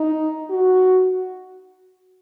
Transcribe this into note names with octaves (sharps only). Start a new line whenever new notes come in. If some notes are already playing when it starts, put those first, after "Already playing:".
Already playing: D#4
F#4